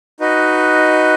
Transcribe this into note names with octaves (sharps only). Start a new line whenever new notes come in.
D#4 F#4 B4 D#5